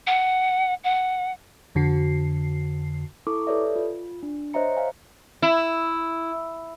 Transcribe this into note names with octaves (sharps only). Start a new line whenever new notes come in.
F#5
F#5
F2 D3 F#4 C7
E4 A4 C#6 D6
G4 A4 B4 C#5 D5 E5
F4
D4
C5 C#5 D#5 E5 A#5 C#7
F5 G#5
E4